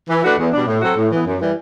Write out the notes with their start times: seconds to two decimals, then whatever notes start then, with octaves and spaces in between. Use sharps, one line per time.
0.09 E3
0.23 A3 D4 F#4 B4
0.39 E2
0.53 B2 G3 D4
0.67 A2
0.82 F#3 C4 F#4 A4
0.97 A2
1.12 E3 B3
1.26 F#2
1.41 E3 G3